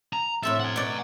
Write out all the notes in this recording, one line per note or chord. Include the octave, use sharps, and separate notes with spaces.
A#5
A2 C4 A4 E5
F#5 G#5
B2 D5